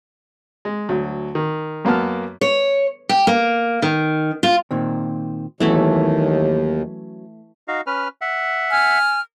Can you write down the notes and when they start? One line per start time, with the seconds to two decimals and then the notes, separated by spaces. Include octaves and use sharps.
0.65 G#3
0.89 D2 F#3
1.35 D#3
1.85 F#2 A#3 B3 A5 F6
2.41 C#5
3.09 G4
3.27 A#3
3.82 D#3
4.43 F4
4.71 A#2 D#3 C4
5.60 D#2 E3 F#3 A3 B3 C#4 E4
7.68 D#4 F#4 F5
7.87 C#4 B4 F6
8.21 E5 F#5
8.70 G#5 F6